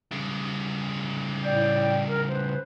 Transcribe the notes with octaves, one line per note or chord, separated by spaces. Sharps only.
C#3 G3
A2 D5 G5
C#4 A#4
B4 C5